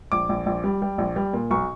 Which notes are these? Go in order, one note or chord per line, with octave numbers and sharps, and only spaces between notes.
A#1 D6
A#1
A#1
G3
G3
A#1
G3
A#2
B1 C#6